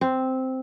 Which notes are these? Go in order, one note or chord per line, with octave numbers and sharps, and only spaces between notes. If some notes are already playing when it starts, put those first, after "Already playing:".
C4